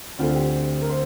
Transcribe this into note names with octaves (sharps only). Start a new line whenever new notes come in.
D2 D3 A3 C4 F4
G4
A#4
C5